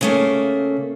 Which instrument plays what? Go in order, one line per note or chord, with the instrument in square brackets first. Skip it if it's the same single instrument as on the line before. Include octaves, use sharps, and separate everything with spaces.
[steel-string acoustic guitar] C#3 A3 A#3